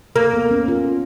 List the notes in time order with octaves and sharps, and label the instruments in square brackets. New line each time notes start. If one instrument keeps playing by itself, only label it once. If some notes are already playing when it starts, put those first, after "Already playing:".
[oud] A#3
[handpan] B3
C#4
F4